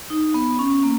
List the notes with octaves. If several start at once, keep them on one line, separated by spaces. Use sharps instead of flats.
D#4
B3
C#4
A#3